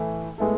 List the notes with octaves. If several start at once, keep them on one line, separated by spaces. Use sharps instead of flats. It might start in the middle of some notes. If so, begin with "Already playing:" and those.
Already playing: A2 E3 A3
A2 G#3 B3 E4 A4